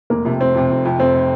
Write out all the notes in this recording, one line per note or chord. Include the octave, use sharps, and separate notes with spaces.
F1 A#3
F2 C3
F1 C4
F2 C3
F1
F2 C3
F1 C4
C3